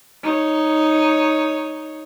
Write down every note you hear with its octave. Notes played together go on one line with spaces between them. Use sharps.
D#4 C#5